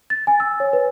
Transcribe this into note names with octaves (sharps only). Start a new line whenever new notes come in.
A6
G#5
E6
C#5
B4